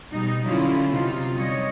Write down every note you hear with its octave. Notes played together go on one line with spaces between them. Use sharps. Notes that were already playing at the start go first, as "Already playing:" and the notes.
B2 G3 D#4
D3 F#3 C#4 E4 F4
C3 D#4 F4
G3 C#5 D#5